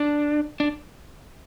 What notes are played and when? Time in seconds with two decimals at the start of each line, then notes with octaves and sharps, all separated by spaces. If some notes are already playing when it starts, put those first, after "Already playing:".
Already playing: D4
0.60 D4